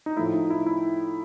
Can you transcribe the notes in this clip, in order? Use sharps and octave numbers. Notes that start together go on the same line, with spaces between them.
D#4
A2 F3 A3 E4
D#4
E4
E4